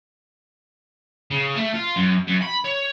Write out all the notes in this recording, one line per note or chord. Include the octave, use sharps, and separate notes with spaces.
C#3
A3
F4
F#2
F#2
B5
C#5